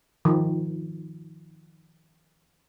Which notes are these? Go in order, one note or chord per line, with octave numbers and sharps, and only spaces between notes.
D#3 F3